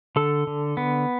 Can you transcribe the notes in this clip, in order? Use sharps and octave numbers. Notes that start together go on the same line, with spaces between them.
D3 A4
D3
B3